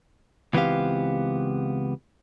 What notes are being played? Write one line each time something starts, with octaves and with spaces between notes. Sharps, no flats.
C#2 E3 B3 C4 G4 F5